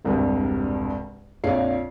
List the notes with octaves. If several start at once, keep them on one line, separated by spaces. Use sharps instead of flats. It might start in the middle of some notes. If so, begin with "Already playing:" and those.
E1 C2 G2 C3
A#1 F2 C#5 D5 F5 C7